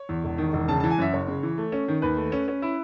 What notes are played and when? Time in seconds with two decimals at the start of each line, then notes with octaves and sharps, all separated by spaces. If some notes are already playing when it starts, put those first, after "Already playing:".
Already playing: C#5
0.09 E2
0.24 E1
0.38 D#3
0.53 E1
0.68 C#3 A5
0.80 E3 A5
0.91 G#5
0.98 F#2 E5
1.13 F#1 C#5
1.28 C#3
1.43 E3
1.58 A3
1.72 C#4
1.88 D#3
2.02 D#2 B4
2.17 A3
2.32 C#4
2.48 C#4
2.62 E4